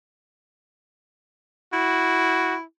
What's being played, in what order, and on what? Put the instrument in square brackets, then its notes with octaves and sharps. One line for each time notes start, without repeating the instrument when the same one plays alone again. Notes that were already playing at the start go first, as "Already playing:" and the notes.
[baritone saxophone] E4 [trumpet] F#4